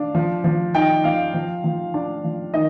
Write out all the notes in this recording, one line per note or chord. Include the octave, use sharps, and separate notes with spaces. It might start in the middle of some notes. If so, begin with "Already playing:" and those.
Already playing: D4 F5
F3
F3
D#4 G5
F3 F5
F3
F3
D4
F3
D#3 D#5